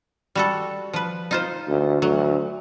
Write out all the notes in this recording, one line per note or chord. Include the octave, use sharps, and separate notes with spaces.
G3 F#4 A4
F3 B4
D#4 F4 C5
D2
D2 F#3